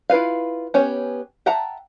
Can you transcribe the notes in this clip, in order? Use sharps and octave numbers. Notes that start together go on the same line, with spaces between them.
E4 F4 B4 F5
B3 C#4 G4 C#5
E5 F#5 G5 A5 A#5